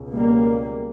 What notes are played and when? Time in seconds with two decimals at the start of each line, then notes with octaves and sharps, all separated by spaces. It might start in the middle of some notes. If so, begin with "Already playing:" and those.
Already playing: C#2 B2
0.13 G3 A#3